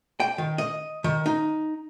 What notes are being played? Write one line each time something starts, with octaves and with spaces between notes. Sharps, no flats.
G5
D#3
D#5
D#3
D#4